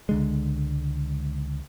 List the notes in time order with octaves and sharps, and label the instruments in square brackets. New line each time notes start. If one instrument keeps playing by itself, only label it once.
[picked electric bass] C#2 D3 G#3